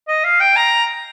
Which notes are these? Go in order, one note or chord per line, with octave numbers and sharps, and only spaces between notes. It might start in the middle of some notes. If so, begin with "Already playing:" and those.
D#5
F5
G5
A#5